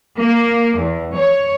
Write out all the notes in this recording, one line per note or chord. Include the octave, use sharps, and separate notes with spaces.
A#3
E2
C#5